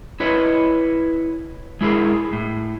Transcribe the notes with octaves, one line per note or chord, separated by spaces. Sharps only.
E4 B4 C#5 D#5
G#3 E4 G#4 A#4
A2